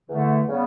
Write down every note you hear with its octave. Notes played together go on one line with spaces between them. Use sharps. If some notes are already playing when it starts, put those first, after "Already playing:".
E2 D3 A3
C#3 G3 B3